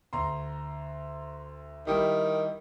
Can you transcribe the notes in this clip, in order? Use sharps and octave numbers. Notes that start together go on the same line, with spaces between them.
D2 A#5 C6
D#3 G3 E4 G4